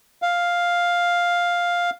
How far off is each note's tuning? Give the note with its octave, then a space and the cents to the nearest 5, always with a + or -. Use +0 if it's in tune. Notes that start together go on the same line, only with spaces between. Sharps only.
F5 +5